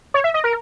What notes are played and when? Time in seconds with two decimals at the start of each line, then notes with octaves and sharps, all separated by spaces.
0.14 C#5
0.24 E5
0.34 D#5
0.44 A#4